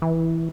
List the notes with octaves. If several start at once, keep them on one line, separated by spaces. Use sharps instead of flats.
E3